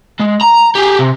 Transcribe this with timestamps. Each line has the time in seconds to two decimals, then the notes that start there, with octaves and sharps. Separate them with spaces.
0.20 G#3
0.41 A#5
0.75 G4 G#4
0.99 C3